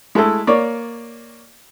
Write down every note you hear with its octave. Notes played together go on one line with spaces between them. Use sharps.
G#3 A3 E4 A4
A#3 C#5 D5